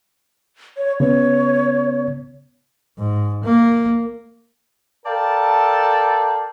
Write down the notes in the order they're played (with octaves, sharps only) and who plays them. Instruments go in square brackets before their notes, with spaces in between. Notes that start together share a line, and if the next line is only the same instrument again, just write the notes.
[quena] C#5
[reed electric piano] C#3 B3 [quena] C#5
[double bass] G#2
A#3
[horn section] A4 A#4 D5 F5 G5 A5